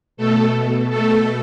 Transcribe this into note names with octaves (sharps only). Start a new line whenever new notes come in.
B2 A3 A4
A3 A4